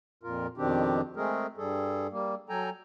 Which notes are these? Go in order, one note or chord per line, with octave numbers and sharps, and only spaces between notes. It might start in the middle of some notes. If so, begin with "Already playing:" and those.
F2 A#2 F4 A#4
F2 B2 D#3 C4 D4 G4
G#3 A3 C4 G#4 A#4
G2 G3 G#4 A4
G3 A#3
F#3 A4 G5 G#5 A#5